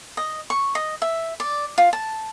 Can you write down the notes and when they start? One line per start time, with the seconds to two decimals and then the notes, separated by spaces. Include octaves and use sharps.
0.17 D#5
0.50 C#6
0.75 D#5
1.02 E5
1.40 D5
1.78 F4
1.93 A5